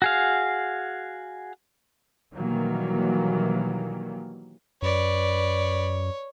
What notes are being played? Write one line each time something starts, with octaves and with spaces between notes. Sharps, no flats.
F#4 G#4 F5
B2 D#3 E3 F#3 G3 A#3
F#2 B4 C#5 D5